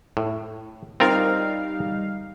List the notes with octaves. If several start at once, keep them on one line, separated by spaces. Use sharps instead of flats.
A2
G3 C4 D#4 F4 A#4 F5